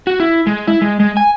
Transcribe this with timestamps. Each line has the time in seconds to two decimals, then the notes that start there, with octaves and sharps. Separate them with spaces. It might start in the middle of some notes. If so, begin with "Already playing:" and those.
0.07 F#4
0.20 E4
0.47 G#3
0.67 E4
0.82 G#3
1.00 G#3
1.17 G#5